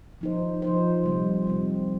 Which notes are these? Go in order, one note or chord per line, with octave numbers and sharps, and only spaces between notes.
F3 D#4 C5
F3 D#4 C5
C3 G3 C4
C3 G3 C4